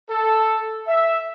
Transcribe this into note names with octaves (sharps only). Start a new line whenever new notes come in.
A4
E5